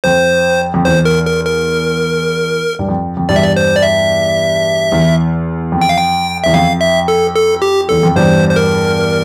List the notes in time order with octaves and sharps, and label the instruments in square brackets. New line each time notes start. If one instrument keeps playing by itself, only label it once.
[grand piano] F2 [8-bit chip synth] C5
[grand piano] F2
[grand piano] E2 [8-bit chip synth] C5
[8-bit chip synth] A#4
A#4
A#4
[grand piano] G2
F2
F2
[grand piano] E2 G2 [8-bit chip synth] D5
[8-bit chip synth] E5
D5
C5
D5
E5
[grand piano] E2
F2
[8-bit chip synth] G5
F5
G5
[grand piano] E2 [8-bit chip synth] E5
[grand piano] F2 [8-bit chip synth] F5
[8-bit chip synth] E5
A4
A4
G4
[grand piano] E2 [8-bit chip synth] A4
[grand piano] F2
[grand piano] E2 G2 [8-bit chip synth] C5
[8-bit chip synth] C5
A#4